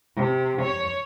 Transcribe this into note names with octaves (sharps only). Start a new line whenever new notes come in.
C3
C#5